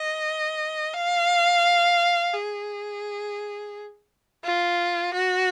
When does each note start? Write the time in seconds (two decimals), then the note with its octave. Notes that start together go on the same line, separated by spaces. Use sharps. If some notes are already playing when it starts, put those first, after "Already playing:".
Already playing: D#5
0.94 F5
2.34 G#4
4.44 F4
5.14 F#4